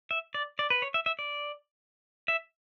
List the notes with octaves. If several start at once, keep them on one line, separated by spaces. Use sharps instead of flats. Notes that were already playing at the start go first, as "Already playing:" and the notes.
E5
D5
D5
B4
C#5
E5
E5
D5
E5